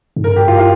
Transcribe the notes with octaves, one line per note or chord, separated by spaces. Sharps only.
G#2
G2 A#4
G4
F4
F4